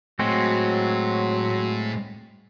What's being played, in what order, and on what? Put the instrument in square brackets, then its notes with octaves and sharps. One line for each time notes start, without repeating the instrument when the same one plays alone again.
[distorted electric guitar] A2 [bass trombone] F#3 [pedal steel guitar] G#3 C4 F#4